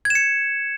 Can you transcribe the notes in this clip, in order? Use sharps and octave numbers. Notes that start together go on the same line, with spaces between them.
G#6
E7
C#7